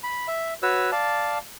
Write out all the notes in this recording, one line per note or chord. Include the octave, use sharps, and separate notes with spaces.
B5
E5
F#4 B4 C#5 E6
D5 F5 A5